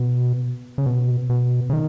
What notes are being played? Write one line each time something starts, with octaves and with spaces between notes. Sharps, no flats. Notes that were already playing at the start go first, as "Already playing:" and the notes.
Already playing: B2
C#3
B2
B2
C#3
D#3